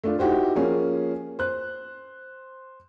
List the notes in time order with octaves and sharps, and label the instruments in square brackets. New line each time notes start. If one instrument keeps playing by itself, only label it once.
[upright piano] A3 D4 F4
D#4 E4 F#4 G4 C5
F3 A#3 C#4 G#4
C5 F#6